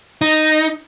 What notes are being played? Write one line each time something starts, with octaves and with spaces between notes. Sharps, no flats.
D#4